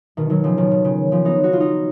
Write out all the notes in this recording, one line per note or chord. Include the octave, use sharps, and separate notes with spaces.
B2 D#3
D#3 F#3
C#3 F3
B2 D#3
B2
C#3
C#3 F3
B3 D#4
D#4 F#4
F4
D#4 F#4